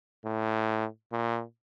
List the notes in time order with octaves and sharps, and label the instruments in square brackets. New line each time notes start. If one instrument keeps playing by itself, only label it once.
[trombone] A2
A#2